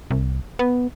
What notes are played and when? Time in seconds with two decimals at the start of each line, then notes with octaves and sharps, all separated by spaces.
0.11 C2
0.59 B3